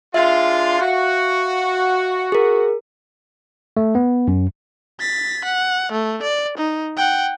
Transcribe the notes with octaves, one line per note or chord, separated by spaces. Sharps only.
G#3 D4 F4 E5 F5
F#4
G#4 A#4
A3
B3
F#2
A6 B6
F#5
A3
D5
D#4
F#5 G5